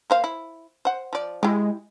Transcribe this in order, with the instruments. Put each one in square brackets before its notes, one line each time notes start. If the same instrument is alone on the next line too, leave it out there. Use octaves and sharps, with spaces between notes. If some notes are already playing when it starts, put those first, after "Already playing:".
[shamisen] A#3 C5 F5
E4
C5 F#5
F3 D5
[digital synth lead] G#3 [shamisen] E4 G4